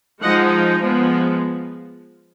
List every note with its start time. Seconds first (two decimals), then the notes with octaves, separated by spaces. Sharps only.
0.22 F3 G#3 D#4 D#5 F#5
0.80 F3 G#3 B3